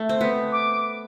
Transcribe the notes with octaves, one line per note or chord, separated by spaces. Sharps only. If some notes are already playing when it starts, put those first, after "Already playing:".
Already playing: A3
C4
B3
D6